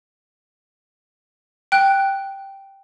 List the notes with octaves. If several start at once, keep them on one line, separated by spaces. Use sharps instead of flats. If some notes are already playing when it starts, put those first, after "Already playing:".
G5 F#6